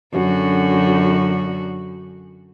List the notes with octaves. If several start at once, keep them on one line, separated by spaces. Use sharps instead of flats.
F#2 D3 F#4